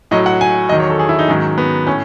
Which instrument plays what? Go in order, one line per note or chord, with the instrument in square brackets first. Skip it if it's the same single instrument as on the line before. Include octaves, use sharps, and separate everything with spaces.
[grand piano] A2 F#3 D#5
F#5
G#5
E2 D#3 F#3 D#5
C#5
A4
G#4
E4
D#4
G#2 D#3 F#3 C#4
B3
A2 C#4